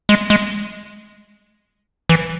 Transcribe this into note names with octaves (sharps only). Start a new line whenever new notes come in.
G#3
G#3
E3